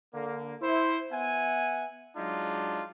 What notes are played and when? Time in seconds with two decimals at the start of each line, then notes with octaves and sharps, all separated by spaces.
0.14 D3 A#3
0.61 E4 C5
1.12 B3 E5 F#5 G#5
2.16 F#3 G#3 D4 D#4 F4